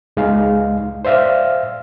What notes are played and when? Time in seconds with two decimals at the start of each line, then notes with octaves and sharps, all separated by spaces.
0.17 C#2 G#3 D#4 F5
1.05 C5 D5 E5 F5 F6